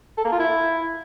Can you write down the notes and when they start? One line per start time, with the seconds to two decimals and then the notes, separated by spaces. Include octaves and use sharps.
0.18 A4
0.25 A#3
0.32 F4
0.40 E4